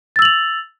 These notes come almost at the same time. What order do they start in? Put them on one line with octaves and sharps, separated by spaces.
A6 E6 F#7 F7